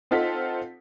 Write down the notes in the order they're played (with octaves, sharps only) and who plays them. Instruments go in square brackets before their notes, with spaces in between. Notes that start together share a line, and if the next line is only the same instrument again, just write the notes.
[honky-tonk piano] C4 D#4 F4 A4 F#5 B6